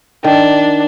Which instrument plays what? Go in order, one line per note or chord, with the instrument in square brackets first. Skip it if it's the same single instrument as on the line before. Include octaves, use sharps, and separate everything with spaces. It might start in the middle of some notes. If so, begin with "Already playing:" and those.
[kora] D#3 [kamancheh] D4